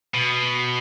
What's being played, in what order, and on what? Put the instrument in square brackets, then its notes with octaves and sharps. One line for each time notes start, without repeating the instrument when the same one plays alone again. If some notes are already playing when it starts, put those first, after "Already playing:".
[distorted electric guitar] B2